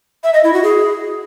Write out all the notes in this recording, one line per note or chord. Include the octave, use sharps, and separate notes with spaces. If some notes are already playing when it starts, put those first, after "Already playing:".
E5
D#5
E4
F#4
G#4